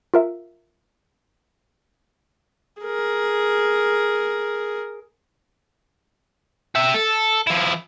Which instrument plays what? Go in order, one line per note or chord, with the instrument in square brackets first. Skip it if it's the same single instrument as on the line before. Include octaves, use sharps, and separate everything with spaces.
[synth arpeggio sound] F4 A#4 E5
[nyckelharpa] G#4 A#4
[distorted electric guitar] G4 E5
A4
F3 E4